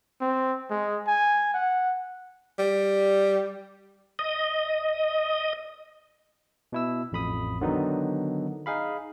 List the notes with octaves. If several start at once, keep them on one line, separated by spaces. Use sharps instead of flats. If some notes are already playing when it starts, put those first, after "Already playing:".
C4
G#3
G#5
F#5
G3
D#5
B2 E4 E6
A1 F2 B5 D#6
D3 D#3 F#3 B3 D#4
D#4 G#4 F5 B5